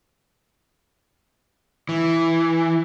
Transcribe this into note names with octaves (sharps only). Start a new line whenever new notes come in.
E3